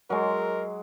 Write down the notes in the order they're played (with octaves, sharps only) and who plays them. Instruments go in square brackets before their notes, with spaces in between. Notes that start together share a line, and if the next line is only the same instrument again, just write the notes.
[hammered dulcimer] F#3 G#3 [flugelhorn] A#4